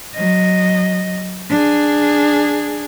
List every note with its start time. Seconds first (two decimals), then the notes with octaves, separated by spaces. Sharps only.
0.16 F#3 D#5
1.50 D4 G#4